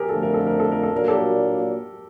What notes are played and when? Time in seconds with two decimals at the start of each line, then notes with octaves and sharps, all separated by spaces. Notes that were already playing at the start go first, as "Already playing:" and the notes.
Already playing: G4 G#4 A#4
0.09 F2 D3 F3 A3 A4
0.23 A#4
0.34 A4
0.47 A#4
0.60 A4
0.72 A#4
0.83 A4
0.92 A#2 F#3 A#3 D4 A#4
1.08 G4 A4